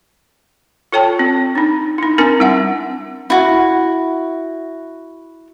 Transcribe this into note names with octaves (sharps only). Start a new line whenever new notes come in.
F4 A4 C#5 G5 A5
C4
D4 D#4
D#4 E4
C4 D4 E4 A#4 G#5
G3 C4 E5 F#5
E4 F#4